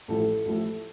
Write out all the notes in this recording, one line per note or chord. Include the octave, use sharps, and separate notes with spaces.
A1 A2 F3 A3 A4
A1 A2 F3 A3